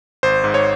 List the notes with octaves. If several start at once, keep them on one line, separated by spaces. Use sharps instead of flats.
G#1 C5
G#2
C#5